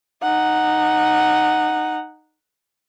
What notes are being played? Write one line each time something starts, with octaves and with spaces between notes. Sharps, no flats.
D#4 F#5